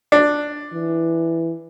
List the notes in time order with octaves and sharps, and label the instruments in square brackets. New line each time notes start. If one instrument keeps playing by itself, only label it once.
[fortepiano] D4
[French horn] E3